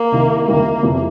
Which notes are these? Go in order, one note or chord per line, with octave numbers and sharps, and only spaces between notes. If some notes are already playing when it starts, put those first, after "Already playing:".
Already playing: A#3
C2 C3 D#3
C#2 C3 D#3 G3 A#3
F1 F2 C3 E3